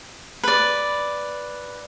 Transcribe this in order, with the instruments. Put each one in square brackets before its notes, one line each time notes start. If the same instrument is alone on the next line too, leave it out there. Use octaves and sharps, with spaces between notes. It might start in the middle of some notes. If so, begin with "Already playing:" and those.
[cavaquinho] B4 D5